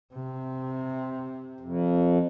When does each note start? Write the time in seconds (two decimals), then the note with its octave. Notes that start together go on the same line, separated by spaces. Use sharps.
0.14 C3
1.60 F2